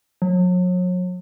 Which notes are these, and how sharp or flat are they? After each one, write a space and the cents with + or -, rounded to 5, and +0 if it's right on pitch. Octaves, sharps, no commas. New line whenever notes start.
F#3 -40